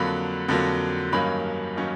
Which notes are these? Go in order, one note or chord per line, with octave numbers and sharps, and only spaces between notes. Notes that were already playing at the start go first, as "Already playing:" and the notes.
Already playing: F2 D3 F#3 A#3 B5
F2 D3 F#3 A#3
G2 D#3 F#3 A#3 C#4 B5
D#3 F#3 A#3 C#4